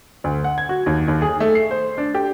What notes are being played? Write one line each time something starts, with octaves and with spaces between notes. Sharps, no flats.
D2
F#5
G#6
F#4
D#2
D#2
G#4
A3
C7
C5
D4
G4